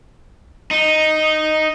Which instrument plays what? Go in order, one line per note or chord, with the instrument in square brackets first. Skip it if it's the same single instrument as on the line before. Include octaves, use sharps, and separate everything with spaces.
[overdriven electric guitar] D#4